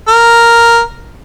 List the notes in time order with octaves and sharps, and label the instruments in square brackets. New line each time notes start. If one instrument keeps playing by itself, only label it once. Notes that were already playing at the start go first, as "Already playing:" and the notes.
[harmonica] A#4